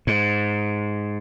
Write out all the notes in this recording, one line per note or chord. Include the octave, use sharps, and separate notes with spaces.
G#2